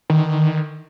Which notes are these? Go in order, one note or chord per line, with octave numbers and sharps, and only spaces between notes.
D#3